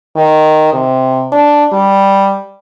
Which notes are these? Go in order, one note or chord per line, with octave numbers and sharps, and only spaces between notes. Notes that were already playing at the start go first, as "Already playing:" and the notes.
D#3
C3
D4
G3